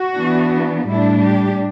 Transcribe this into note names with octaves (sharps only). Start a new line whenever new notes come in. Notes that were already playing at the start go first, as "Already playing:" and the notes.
Already playing: F#4
E3 B3 D4
A2 G3 D4 E4
G4